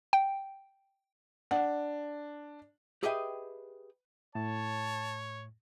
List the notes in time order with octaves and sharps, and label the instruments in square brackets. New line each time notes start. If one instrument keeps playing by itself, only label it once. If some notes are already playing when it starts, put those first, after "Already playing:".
[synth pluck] G5
[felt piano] D4 [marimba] F#5
[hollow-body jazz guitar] G4 G#4 B4 D#5 E5 G5
[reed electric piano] A2 [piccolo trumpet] C#5 [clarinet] A5